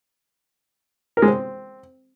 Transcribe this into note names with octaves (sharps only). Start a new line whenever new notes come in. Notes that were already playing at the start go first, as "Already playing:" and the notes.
A#4
G#3
C4